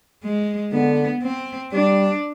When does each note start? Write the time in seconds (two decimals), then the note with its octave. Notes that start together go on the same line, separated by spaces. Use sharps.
0.24 G#3
0.72 D3 B3
1.22 C4
1.73 G3 D4